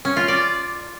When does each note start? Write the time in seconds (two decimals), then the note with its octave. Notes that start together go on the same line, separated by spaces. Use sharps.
0.05 C#4
0.17 F4
0.28 D5